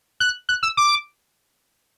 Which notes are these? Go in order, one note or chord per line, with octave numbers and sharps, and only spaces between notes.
F#6
F#6
E6
D6